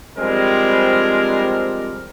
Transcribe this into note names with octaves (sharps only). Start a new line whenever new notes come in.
F3 G3 G#3 C4 D4 A#4